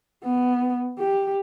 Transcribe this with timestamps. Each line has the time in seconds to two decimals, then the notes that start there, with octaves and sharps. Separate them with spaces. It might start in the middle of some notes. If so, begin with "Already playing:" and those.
0.24 B3
0.99 G4